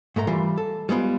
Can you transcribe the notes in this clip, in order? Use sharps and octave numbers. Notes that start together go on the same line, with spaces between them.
G#2 A3 A#4 A#5
E3 G3 F4
A4
G3 G#3 B3 F4